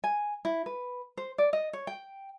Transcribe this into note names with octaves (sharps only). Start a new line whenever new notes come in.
G#5
E4
B4
C5
D5
D#5
C#5
G5